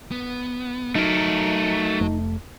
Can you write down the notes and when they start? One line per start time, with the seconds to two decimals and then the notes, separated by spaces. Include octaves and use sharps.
0.11 B3
0.95 F#3 A3 D#4 A#4
2.01 F1 A3